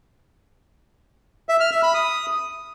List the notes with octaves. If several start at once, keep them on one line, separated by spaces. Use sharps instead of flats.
E5
F6
E5
B5
D#6